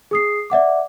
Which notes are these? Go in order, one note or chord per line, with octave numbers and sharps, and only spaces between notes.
G#4 D#6 C7
D5 E5 F#5 D6